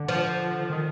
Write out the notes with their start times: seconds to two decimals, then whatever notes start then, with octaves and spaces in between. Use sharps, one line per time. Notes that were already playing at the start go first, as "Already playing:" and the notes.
Already playing: D3
0.08 F3
0.70 D#3